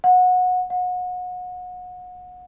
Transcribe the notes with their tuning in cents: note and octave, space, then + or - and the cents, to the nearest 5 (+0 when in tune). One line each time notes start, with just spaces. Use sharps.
F#5 -20
F#5 -30